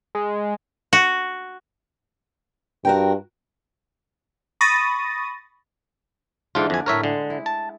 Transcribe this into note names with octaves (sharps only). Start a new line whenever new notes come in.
G#3
F#4
G2 F#4 A#4 G5
B5 C#6 D#6 A6 A#6 D#7
G#2 D3 E3 F4 D5
F2 D4 G#5
A2 A#4 B4 C#5 E5
D3 G#3
E4
A5